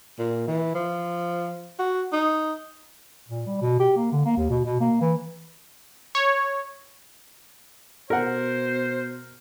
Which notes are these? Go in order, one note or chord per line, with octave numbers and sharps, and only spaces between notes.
A#2
E3
F3
F#4
D#4
A#2
G3
B2
G4
A#3
D3
A#3
D#2
B2
B2
A#3
E3
C#5
B2 A#4 C5 F#5